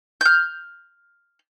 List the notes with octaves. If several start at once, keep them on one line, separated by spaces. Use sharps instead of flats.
F6 G6